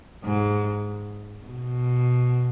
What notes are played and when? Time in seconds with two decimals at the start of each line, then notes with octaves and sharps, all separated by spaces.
0.24 G#2
1.46 B2